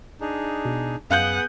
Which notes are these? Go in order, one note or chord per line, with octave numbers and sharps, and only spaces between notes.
D4 D#4 G#4
B2
F#2 B3 G#4 F5 F#5 D#6 F#6 G6